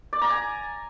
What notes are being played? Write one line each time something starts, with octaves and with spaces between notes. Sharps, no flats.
D5
A#5
G#5